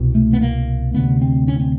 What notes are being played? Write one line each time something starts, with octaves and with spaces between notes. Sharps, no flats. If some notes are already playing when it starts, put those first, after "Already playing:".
Already playing: C2 B2
A3
B3
A#3
D2 C3 B3
C4
C#4
C4